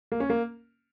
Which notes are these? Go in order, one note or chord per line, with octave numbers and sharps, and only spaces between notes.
A#3
C#4
A#3